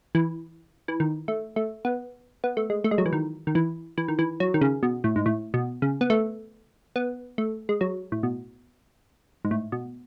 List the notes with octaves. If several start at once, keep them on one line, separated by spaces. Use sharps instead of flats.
E3
E3
D#3
A3
A3
B3
B3
A3
G#3
A3
G#3
F#3
E3
D#3
D#3
E3
E3
D#3
E3
F#3
D#3
C#3
B2
A2
G#2
A2
B2
C#3
B3
A3
B3
A3
G#3
F#3
A2
B2
G#2
A2
B2